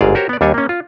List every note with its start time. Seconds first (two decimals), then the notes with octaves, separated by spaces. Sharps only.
0.01 G1 G#2 G#4 D5 F5
0.15 F#4 G4 A#4 C5 C#5
0.29 B3 D5
0.41 D#2 G3 D4 C#5 G#5
0.54 A#3 C#4
0.69 F4